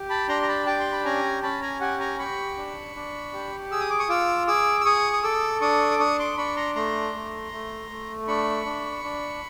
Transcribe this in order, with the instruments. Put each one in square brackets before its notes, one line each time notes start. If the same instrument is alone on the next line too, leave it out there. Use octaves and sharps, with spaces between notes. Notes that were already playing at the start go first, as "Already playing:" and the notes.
Already playing: [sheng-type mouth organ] G4
A5 B5
D4 A#5 C6
A#5
A5 B5
G4 G5 A5
C6
B5
C#4 G#5 A#5
C#4 A5 B5
G#5 A#5
G4 F#5 G#5
G#5 A#5
G4 B5 C#6
D4
D4
G4
G#4 E6
D#6
D6
C#6 D#6
F4 D6 E6
G#4 D6 E6
E6
G#4 C#6 D#6
D#6
A4 D6 E6
D4 C#6 D#6
D6
D4 C#6 D#6
C6 D6
D4 B5 C#6
A#5 C6
A3 A#5 C6
A3
A3
A3
D4 B5 C#6
D4
D4